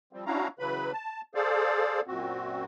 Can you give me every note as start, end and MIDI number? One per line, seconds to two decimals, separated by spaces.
0.13 0.24 53
0.13 0.24 55
0.13 0.24 60
0.26 0.48 61
0.26 0.48 62
0.26 0.48 64
0.26 0.48 66
0.26 0.48 77
0.26 0.48 82
0.59 0.92 49
0.59 0.92 52
0.59 0.92 54
0.59 0.92 71
0.59 0.92 83
0.92 1.21 81
1.35 2.01 68
1.35 2.01 69
1.35 2.01 72
1.35 2.01 74
1.35 2.01 77
2.07 2.65 42
2.07 2.65 46
2.07 2.65 60
2.07 2.65 66